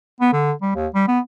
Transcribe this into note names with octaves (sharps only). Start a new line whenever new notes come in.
B3
D3
G3
D#2
G3
B3